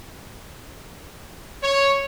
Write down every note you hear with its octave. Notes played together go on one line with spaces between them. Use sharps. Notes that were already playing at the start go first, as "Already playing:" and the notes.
C#5